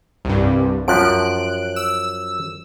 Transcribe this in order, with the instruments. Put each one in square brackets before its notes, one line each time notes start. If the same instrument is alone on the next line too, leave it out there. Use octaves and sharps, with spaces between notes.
[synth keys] C2 G2
[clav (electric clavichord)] F#2 F3 [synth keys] F#6 D7
[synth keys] E6